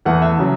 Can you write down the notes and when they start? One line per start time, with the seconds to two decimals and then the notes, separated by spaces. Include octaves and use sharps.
0.05 E2 E3 A3 F#5
0.22 E5
0.38 C#3 F#3